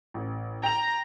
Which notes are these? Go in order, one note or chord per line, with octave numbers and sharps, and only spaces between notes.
A1
G5 A#5 F7